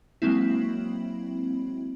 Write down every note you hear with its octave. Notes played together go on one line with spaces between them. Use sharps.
F#3 G#3 A#3 C4 E4